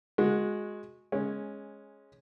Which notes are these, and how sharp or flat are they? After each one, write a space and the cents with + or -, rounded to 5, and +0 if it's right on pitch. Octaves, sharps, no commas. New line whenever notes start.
G#3 +0 F#4 -20
G#3 +0 C#4 -10